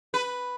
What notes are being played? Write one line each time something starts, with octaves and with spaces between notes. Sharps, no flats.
B4